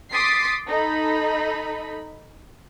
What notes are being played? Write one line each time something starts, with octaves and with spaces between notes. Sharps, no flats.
C6 D6 D#6 A6 B6 C7
D#4 A4 B5